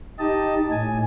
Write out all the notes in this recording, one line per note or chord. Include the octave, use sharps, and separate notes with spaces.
D#4 G4 D#5 A5
A2 G#5